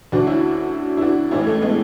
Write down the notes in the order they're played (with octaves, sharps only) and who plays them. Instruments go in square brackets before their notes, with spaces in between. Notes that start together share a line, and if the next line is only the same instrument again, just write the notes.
[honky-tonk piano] D2 D3 D4 F#4
C#4 E4
E4
D4 F#4
A1 A2 E3 C#4 E4
A3 C#4
G#3 B3